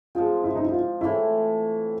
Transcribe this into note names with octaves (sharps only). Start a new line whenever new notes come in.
F3 G#3 C4 F4
E4
D#4
E4
F4
A2 E3 A3 E4